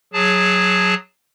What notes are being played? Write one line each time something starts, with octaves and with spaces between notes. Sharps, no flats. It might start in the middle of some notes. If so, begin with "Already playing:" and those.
F#3 G#4 A5